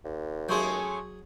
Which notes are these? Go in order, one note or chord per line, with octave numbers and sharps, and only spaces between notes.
D#2
F#3 G#3 A3 C#4 G#4 C6 C#6 G6